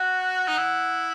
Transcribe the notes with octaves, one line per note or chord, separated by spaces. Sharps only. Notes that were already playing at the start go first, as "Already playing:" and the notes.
Already playing: F#4 F#5
D#4
E4